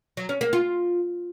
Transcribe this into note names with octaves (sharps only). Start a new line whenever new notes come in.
F#3
C#4
A#3
F4